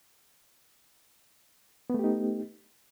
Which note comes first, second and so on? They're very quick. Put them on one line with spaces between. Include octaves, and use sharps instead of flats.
B3 A3 G4 D#4